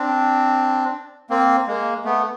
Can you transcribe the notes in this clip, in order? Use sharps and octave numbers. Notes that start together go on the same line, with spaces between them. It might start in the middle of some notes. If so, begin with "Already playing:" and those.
Already playing: C4 D4
A#3 C4
G#3 A#3
A3 B3